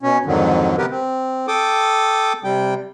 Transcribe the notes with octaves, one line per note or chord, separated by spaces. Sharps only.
B2 C#4
F2 G#2 D3 D#3 F#3
C3 B3 G4 A#4 B4
C4
A4 G5 D6 D#6
C3 G3 G5